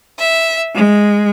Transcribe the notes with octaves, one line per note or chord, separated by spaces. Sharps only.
E5
G#3